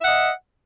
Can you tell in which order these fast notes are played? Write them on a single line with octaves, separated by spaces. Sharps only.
E5 F#5 D#5